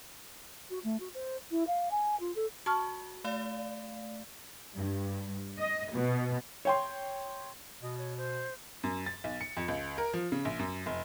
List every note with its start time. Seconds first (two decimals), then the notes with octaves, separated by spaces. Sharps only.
0.70 F#4
0.84 A3
1.00 F#4
1.14 C5
1.50 E4
1.67 F5
1.91 G#5
2.19 F4
2.35 A4
2.66 F#4 A5 C#6 F6
3.24 A3 D5 F5
4.77 G2
5.57 D#5
5.92 B2
6.65 C#5 G5 C6
7.82 B2 D#5
7.98 C#5
8.17 C5
8.83 F#2
9.06 A6
9.24 B1
9.41 C#7
9.57 F2
9.68 C#2
9.98 A#4
10.13 F3
10.32 C#3
10.45 A#1
10.59 F#2
10.86 F1